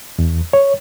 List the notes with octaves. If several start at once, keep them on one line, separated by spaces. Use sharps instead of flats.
E2
C#5